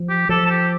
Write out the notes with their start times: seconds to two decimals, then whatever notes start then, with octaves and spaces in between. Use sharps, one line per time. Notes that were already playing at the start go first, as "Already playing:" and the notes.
Already playing: F3
0.09 G4
0.29 F3 A4
0.45 A4
0.50 G4